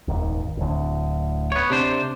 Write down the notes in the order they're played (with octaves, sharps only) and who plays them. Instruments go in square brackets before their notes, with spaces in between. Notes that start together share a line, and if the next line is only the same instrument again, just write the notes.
[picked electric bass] D#1 G#1 D#2
D1 D2
[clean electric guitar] B3 C#5
C3 D4 C5